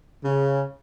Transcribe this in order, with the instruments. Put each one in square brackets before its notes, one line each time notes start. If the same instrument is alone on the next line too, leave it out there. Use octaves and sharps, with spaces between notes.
[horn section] C#3